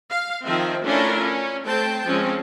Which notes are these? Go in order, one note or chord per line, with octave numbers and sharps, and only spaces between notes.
F5
D#3 F3 C4 E5
A3 C#4 D4 E4 F4 A#4
C#4
A3 C4 C5 G5 A5
F3 G#3 C4 C#4